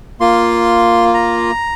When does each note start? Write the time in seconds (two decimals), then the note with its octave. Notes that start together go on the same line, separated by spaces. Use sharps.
0.20 A#3 F4 C6
1.14 A#5